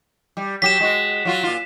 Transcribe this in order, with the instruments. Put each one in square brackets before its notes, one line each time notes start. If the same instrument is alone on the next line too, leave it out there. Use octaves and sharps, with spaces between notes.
[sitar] G3
[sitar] F#3 G4 [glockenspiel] B6 E7
[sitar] G#3 F#4
F#3 F4 F#4
A#2 F4